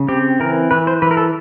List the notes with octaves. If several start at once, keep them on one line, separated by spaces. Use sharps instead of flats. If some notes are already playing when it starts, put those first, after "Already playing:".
Already playing: C#3
C4 G4
E3 A#4
E3 B4
C5
E3 B4
A#4
A4